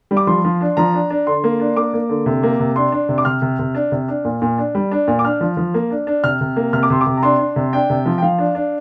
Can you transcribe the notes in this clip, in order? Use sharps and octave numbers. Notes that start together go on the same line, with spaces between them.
G3
D6
F3 C6
F3
D4
F3 A#5
D4
D4
D3 C6
A#3
D4
A#3 D6
A#3
D3
C3
A#3
C3
D4 C6
D4
C3
D6
C3 F6
C3
C3
D4
C3
D4
A#2
A#2
D4
G3
D4
A#2
D6
D4 F6
F3
F3
A#3
D4
D4
C3 F6
C3
A#3
C3 F6
D6
C3 C6
D6
C3
A#5
D4 C6
D4
C3
D4 G5
C3
F3
G5
F3 F5
D4
D4